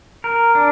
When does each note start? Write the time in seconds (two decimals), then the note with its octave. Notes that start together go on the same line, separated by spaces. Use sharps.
0.24 A#4
0.55 D4